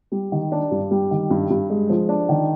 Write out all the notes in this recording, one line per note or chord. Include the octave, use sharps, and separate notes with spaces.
G3
D#3
D4
G2
G3
D#3
G2
G2
G#3
F3
D4
D#3